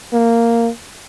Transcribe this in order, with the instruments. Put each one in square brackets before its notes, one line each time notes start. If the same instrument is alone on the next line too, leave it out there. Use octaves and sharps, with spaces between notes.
[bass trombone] A#3